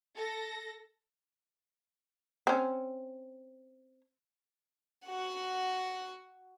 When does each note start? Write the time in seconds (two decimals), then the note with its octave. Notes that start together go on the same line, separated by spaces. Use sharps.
0.15 A4 A#6
2.47 C4 C#4
5.07 F#4 F#5